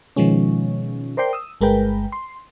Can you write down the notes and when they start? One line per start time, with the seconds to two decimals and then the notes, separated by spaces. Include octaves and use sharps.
0.16 B2 D#3 F3 G#3 C#4
1.17 A#4 C5 D5 G5 C7
1.33 D#6 E6
1.61 G1 G#3 A#4 B4 G5
2.12 C6